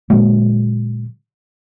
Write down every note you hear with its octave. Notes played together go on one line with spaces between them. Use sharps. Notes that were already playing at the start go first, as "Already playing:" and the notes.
A#2 D3 F#3 G#3